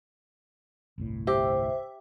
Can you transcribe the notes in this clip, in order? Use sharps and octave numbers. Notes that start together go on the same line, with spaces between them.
G1 C2 A2
G4 C5 E5